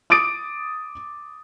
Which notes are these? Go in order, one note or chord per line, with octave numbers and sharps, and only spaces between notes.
D6 D#6 A6 D7